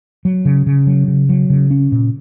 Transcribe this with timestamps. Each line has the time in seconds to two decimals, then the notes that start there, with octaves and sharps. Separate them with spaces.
0.25 F#3
0.45 C#3
0.66 C#3
0.87 F#3
1.08 C#3
1.29 F#3
1.50 C#3
1.71 C#4
1.92 A#2